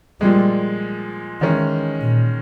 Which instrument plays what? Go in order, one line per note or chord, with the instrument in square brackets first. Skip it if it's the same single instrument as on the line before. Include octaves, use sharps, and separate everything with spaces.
[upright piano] A#2 F3 G#3 [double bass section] G3
[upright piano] D#3 G#3 C#4 [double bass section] E3
[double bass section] A#2